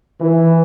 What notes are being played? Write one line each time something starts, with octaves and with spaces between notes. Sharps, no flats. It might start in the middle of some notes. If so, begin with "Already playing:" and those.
E3